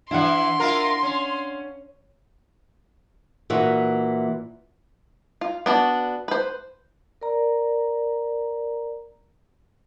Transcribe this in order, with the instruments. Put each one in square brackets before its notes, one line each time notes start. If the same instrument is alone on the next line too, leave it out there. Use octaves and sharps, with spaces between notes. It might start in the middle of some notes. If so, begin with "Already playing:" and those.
[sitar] E3 E4 [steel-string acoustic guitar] D4 F5 F#5 [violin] C6
[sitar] E4 F4 A#4
C#4
[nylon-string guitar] A#2 E3 D#4 F#4
[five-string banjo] F4
B3 D4 F#4
B4 C5
[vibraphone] A#4 D5 A#5